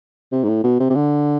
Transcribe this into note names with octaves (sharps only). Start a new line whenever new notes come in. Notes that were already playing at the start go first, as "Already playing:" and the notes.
C3
G#2
A2
B2
C3
C3
D3